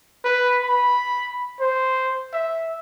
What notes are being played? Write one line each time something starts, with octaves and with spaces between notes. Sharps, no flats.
B4
B5
C5
E5